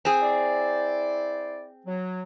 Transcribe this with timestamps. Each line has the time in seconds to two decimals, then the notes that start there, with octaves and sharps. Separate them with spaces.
0.05 C4 G#4
0.22 E4 C5 D5
1.86 F#3